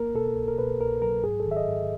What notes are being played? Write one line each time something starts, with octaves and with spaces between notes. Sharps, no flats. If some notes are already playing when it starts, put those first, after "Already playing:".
Already playing: A#3 A#4
B2 A4
C2
A#4
B2 B4
C2 A#4
F#3 A#4
G#2 G#4
A4
D#3
E5
D#5
G#2